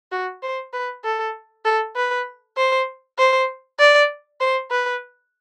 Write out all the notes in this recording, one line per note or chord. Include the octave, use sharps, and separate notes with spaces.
F#4
C5
B4
A4
A4
B4
C5
C5
D5
C5
B4